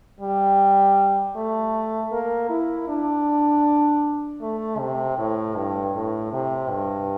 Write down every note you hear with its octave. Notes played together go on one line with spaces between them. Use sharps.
G3
A3
A#3
E4
D4
A3
C3
A2
G2
A2
C3
G2